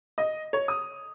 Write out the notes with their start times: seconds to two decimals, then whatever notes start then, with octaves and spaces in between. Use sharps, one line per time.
0.18 D#5
0.53 C#5
0.68 D#6